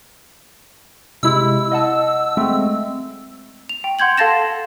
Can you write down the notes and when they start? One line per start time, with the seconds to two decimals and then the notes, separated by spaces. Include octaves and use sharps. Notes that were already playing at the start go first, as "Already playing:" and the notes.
1.23 C3 G#3 E4 E6
1.72 D#5 F#5 A5
2.37 G#3 A3 C4
3.69 F7
3.84 G5
3.99 F#5 C6 G6 G#6 F#7
4.17 A4 F5 A5 A6 A#6 E7